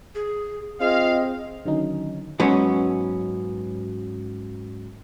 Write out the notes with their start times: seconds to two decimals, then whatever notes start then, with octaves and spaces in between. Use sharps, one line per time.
0.15 G#4
0.80 C4 F4 G#4 D#5 F5
1.65 D3 D#3 F#3 C#4 D#4
2.40 G#2 F#3 B3 C#4